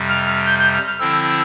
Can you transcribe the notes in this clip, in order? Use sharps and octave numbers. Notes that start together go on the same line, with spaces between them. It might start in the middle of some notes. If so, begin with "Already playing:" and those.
Already playing: F2 C3 G3
F6
F6
G6
G6
F6
F6
D3 F3 C4 E4 E6
E6